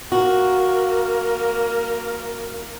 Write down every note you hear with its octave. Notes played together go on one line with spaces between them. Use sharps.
A#3 F#4 A#4